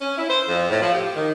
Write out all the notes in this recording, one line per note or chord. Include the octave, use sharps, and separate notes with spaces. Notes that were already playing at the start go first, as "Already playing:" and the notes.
C#4
E4
C5
F2
A2
F3
G4
D#3